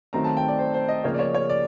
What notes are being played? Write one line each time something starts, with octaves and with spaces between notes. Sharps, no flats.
D#3 F#3 A3 C4 A#5
A5
G5
D5
C5
C5
D#5
C#3 F3 A#3 C#4 C#5
D5
C#5
C#5
D5